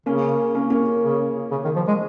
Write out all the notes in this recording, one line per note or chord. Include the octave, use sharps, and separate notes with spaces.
C#3 A#3 C#4
A#3 C#4
A#3 C#4
C#3
C#3
D#3
F3
G#3